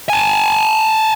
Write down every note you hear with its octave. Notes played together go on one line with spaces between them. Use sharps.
G#5 A5